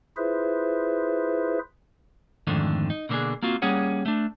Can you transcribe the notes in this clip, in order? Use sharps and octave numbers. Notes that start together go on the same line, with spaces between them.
E4 F4 G#4 B4 C5 E5
F2 G#2 D3 D#3 A3 D4
D#4
B2 D3 A#3 C4 D4 G#4
A#3 C4 F4 F#4
G3 A#3 C#4 G#4 C#5 F#5
A3 D4